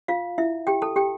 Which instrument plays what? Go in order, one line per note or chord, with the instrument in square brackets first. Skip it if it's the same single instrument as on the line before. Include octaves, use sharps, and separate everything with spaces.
[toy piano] F4 F5
E4 E5
G4 G5
A4 A5
G4 G5